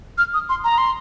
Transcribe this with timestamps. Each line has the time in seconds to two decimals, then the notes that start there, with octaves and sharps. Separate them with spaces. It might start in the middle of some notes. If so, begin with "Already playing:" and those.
0.18 F6
0.34 D#6
0.49 C6
0.64 A#5
0.78 C6